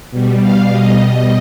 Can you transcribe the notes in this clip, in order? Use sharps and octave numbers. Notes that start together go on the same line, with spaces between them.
B2 G3
F5
B2 G3 D#5